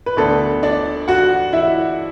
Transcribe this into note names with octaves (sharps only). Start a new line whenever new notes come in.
B4
D2 D3 B3 D4 A4
D4 D5
F#4 F#5
E4 E5